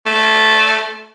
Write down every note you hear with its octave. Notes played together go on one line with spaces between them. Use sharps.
A3